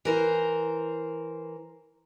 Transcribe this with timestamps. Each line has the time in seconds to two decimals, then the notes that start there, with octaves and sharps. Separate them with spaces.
0.05 E3 A#4 C5